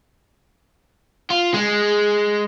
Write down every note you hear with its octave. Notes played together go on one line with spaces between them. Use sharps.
F4
G#3